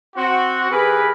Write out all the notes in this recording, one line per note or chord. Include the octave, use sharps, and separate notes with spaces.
C4 F#4
E3 G4 G#4 A#4 B4